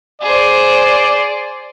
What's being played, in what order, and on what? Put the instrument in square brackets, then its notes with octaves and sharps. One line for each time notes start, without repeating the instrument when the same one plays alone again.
[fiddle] G#4 C5 [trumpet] D5